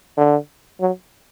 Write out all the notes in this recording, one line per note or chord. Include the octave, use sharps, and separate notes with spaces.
D3
F#3